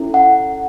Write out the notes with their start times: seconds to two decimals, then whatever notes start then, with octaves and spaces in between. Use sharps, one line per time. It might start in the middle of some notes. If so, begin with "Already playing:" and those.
Already playing: C#4 E4 A4
0.14 F#5